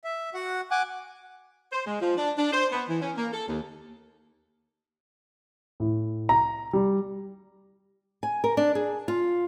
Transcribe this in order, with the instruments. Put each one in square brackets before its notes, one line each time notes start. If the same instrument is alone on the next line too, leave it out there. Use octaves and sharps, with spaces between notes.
[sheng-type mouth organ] E5
F#4 F#5
[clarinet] F#5 [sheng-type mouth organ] G#5 D6
[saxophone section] C5
G#3
F3
D4
D4
C5
B3
E3
C#4
A#3
A4
D#2
[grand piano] A2
A#5
G3
[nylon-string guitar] G#5
A#4
D4
G#4
F4